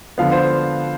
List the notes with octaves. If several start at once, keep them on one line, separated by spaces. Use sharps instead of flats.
D3 F3 B3 F5
C5